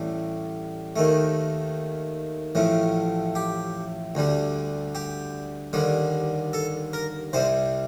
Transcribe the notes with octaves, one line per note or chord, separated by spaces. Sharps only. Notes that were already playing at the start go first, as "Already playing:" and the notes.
Already playing: A1 A2 G3
D#2 D#3 A3
A1 A2 F3 A3
G4
D2 D3 G3
G4
D#2 D3 G3
A4
A#4
C2 C3 G3 C5